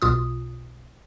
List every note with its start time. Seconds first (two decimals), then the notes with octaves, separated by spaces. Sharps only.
0.02 B1 B2 F4 D#6